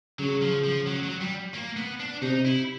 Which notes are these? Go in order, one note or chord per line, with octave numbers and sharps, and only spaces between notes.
C#3 F#3
F3
F3
F#3
F#3
G3
A#3
B3
D4
C3 D#4
E4